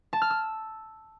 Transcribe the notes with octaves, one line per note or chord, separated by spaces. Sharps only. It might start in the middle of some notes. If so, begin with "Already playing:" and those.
A5
F6
E6